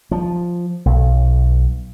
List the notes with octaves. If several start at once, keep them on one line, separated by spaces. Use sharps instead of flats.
F3
B1